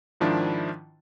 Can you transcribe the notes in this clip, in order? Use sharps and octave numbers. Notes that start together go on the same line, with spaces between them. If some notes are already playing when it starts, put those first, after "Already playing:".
G#2 D#3 F3 D4 E4